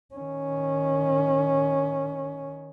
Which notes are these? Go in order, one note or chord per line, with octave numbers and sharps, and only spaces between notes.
D#3 C#4